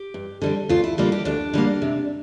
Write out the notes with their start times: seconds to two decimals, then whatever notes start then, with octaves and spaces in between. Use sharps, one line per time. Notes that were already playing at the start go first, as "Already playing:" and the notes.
Already playing: G4
0.14 G2
0.42 D3 G3 C4
0.69 D2 F4
0.84 E4
0.98 D3 G3 A#3 F4
1.12 G4
1.25 D2 D4
1.54 D3 G3 A#3
1.82 C3